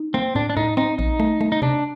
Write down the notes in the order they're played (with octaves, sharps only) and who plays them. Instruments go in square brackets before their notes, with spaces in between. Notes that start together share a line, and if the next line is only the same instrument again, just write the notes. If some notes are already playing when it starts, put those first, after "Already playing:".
Already playing: [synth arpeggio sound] D#4
[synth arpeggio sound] A#3 [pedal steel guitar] C4
[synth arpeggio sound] A2 [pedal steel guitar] D4
[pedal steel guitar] D4
[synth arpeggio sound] A2 [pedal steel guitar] D#4
[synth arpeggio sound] C4 [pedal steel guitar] D#4
[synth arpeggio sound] A#1 [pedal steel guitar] D#4
[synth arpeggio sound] A3
A3
[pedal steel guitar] D#4
[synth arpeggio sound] C3 [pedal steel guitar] D4